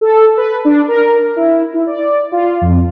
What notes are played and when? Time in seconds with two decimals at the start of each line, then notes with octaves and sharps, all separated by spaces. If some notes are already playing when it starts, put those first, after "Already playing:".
0.01 A4
0.37 B4
0.65 D4
0.88 A#4
1.36 E4
1.74 E4
1.87 D5
2.32 F4
2.61 F2